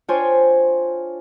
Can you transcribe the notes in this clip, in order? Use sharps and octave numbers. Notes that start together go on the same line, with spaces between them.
D4 F4 C5 C#5 G5 G#5